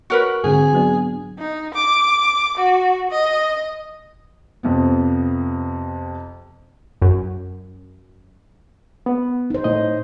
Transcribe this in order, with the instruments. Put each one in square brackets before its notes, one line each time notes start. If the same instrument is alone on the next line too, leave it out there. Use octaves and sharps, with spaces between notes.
[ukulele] F#4 A#4 B4 [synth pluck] C#5 F#5 C#6
[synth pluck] G#2 D3 C4 [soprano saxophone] G#4
[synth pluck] F#3 B3 D4
[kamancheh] D#4
D6
F#4
D#5
[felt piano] F2 C3 B3
[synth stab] F#2
[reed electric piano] B3
[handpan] D#4 C5
[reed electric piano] A2 D#5